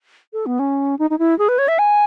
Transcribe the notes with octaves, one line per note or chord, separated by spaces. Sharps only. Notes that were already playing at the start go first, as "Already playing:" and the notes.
A4
B3
C#4
D#4
D#4
E4
G#4
B4
C#5
E5
G#5